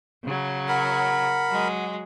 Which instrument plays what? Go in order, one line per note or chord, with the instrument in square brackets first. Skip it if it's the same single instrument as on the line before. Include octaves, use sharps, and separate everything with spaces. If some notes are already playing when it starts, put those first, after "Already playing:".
[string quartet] C#3 F#3
[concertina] A#4 B5 [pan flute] F#5
[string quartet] F#3 G#3